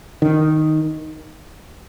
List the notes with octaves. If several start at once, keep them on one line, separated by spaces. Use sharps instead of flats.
D#3